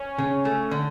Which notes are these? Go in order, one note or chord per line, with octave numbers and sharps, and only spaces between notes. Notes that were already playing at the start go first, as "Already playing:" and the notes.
Already playing: C#4
C#3
A3
D3